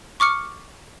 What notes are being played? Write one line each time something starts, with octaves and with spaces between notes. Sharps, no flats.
C#6 D6 F6 C#7